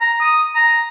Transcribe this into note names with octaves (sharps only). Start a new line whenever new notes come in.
A#5
D#6
A#5